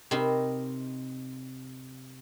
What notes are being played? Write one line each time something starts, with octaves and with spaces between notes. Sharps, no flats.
C3 C4 D#4 A#4 B5